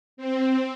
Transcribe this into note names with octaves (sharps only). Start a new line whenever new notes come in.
C4